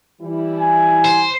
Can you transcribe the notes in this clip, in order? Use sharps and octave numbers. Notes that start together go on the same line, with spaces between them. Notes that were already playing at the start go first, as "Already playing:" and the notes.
E3 G3 E4
G#5
C5